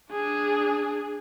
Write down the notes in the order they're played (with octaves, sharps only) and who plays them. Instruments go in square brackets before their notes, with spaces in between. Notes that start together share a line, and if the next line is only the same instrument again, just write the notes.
[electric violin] D4 G#4